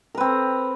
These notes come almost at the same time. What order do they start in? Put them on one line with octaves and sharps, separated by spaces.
A#4 B4 C4